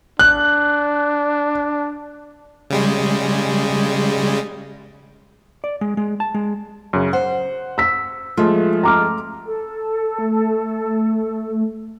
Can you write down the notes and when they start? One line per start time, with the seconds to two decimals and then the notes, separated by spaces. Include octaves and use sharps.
0.19 D4 F#6
2.70 C#3 G3 G#3
5.64 D5
5.81 G#3
5.97 G#3
6.20 A5
6.34 G#3
6.93 F#2 C#3 C#4
7.13 C5 F#5
7.78 E6 B6
8.37 F3 G#3 A3 F4
8.83 A#5 D6 F6
9.45 A4
10.18 A3